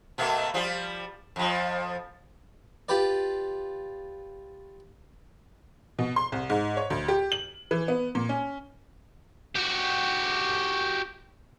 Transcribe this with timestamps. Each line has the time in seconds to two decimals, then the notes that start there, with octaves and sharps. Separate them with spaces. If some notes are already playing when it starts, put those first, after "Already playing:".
0.18 B2 A3 A#3
0.54 F3 G3 F4
1.36 F2 F3
2.89 F4 G4 B4 D5
5.99 B2
6.16 C6
6.32 C2
6.50 G#2
6.77 C#5
6.90 D2
7.08 G4
7.32 F#7
7.71 E3
7.88 B3
8.15 A#2
8.29 C#4
9.56 F#4 G4